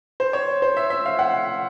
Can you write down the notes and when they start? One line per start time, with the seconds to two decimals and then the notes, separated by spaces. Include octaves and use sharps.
0.20 C5
0.33 C#5
0.62 C5
0.77 E5
0.90 E5
1.06 F5
1.19 F#5